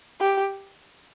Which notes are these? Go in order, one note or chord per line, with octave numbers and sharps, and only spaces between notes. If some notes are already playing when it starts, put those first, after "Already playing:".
G4